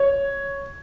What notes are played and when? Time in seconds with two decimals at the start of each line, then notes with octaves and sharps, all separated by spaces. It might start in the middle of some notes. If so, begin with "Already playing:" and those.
Already playing: C#5